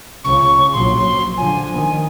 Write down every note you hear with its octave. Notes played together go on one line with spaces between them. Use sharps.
C#2 C#3 C#6
A#1 F#3 C6
D3 F3 G#5
D#3